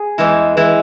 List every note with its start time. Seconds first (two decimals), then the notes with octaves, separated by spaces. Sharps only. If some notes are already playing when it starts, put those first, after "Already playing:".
Already playing: G#4
0.18 E2 E3 G#3 E4
0.57 E3 G#3 E4